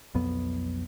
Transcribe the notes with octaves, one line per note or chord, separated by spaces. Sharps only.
B1 F2 B3